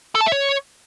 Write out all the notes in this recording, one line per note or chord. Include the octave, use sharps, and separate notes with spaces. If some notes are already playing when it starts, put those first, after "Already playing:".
A4
A5
E5
C#5